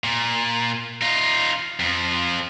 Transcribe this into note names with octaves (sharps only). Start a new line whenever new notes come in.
A#2
D#4 F4
F2 F3